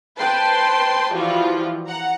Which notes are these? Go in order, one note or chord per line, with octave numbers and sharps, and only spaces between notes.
B4 C5 G5 A5 C6
E3 F3 G3 F4 F#4
F#5 A#5